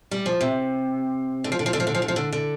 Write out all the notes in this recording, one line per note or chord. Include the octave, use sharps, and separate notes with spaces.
G3
F3
C3
D3
F3
D3
F3
D3
F3
D3
F3
D3
F3
D3
D3